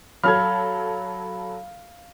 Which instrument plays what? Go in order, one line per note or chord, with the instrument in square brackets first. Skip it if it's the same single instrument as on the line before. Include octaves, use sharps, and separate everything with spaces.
[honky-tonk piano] F#3 A4 [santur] F5 [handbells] B5 [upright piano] F6 G#6